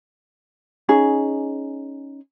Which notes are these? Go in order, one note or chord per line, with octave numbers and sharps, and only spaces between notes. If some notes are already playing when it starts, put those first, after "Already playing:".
C#4 D#4 G#4